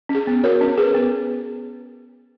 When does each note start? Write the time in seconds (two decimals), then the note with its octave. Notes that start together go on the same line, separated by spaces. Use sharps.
0.09 C#4
0.15 G#4
0.27 B3
0.43 F#4 A#4 C#5
0.61 C#4
0.78 G#4 B4
0.94 B3